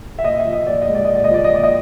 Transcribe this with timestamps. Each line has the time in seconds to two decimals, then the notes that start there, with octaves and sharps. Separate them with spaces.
0.19 E5
0.24 A#2 D#5
0.40 E5
0.47 F3
0.53 D#5
0.67 A#2 D5
0.82 D#5
0.88 G#3
0.95 D5
1.05 A#2 D#5
1.15 D5
1.24 D#5
1.30 F3 D5
1.44 D#5
1.51 A#2 D5
1.63 D#5